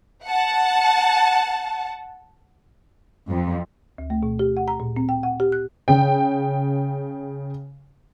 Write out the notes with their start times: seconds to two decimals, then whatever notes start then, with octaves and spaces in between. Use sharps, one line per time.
0.24 F#5 A5
3.29 F2
3.98 D2
4.10 A3
4.23 B2
4.39 G4
4.57 F#5
4.68 A#5
4.80 A#2
4.96 C4
5.09 G5
5.23 F#5
5.40 G4
5.52 F#6
5.88 C#3 G5